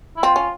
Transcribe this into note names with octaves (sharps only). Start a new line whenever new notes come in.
E4
C4 F4
C#4